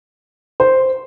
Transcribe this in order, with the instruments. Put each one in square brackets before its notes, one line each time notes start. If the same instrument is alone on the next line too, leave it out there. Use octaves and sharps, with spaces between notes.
[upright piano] C5